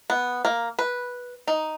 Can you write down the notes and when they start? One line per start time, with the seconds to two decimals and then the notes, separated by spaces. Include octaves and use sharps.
0.10 B3
0.45 A#3
0.79 B4
1.47 D#4